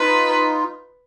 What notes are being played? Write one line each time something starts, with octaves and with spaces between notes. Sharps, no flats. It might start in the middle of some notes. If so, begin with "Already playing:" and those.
Already playing: D#4 F4 B4